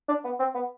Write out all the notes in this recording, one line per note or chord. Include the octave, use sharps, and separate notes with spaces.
D4
B3
C4
B3